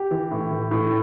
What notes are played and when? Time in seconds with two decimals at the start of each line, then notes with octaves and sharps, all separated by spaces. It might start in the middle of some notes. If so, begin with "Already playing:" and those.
Already playing: G4
0.11 E3
0.31 A2
0.51 E3
0.71 A2